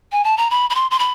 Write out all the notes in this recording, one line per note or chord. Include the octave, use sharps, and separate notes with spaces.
G#5
A5
A#5
B5
B5
C6
C6
B5